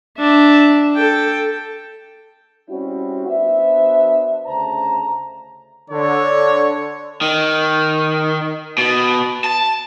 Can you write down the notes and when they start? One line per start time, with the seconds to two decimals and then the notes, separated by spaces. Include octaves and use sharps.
0.19 D4 E5
0.96 A4 G5
2.69 G3 C4 C#4 E4 F#4
3.27 B3 D4 F#4 C5 E5
4.46 D2 C#3 C5 A5 A#5
5.90 D3 C#5
7.21 D#3
8.78 B2
9.44 A5